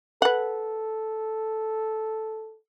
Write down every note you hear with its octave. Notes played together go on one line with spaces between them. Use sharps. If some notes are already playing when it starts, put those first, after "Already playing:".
A4 B4 F#5